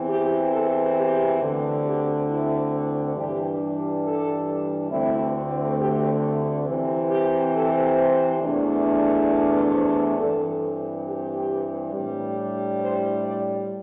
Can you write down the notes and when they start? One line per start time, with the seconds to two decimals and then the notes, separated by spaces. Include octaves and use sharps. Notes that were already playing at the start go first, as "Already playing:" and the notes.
Already playing: E2 E3 C4
0.09 G4
0.52 A4
0.96 G4
1.40 D2 D3 C4
1.84 G4
2.28 E4
3.15 G2 E3 G3 D4 G4
4.03 A4
4.91 D2 D3 A3 C4 E4
5.79 G4
6.67 C3 E3 C4
7.10 G4
7.54 A4
7.98 C5
8.42 E2 E3 A3 D4
8.85 D5
9.30 D5
9.73 C5
10.17 G2 E3 C4 A4
11.05 G4
11.93 A2 G3 D4
12.80 C5
13.24 D5